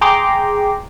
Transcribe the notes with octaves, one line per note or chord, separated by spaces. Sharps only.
G#4 G5 A#5 C6 D6